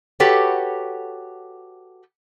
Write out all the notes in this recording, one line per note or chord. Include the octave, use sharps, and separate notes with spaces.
F#4 G4 A4 B4 C#5